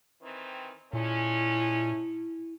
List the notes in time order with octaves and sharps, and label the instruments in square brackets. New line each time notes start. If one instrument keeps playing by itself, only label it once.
[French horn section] D#3 E3 C4
[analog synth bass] A#2 [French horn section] G#3 A3 C#4 [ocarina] E4